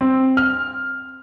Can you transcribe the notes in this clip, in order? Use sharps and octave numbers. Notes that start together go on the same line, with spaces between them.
C4
F6